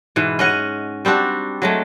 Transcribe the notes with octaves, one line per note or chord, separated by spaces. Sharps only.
G#2 B2 E3
C#4 D#5 F#5
G3 C4 D4 F#4
F#3 G#3 A3